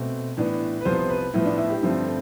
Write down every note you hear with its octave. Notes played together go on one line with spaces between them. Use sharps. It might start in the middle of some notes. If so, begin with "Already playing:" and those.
Already playing: B2 A3 C4
A2 E3 B3 D4
B4
C2 C3 F3 B3 C5
B4
A2 F3 B3 E4
D4
E4
G4
G2 D3 F3 A3 C4 A4